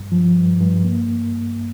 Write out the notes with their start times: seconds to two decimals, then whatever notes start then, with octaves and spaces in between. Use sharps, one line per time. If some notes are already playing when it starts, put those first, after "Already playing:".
Already playing: G2
0.12 F3
0.36 G2
0.60 G2
0.85 A#3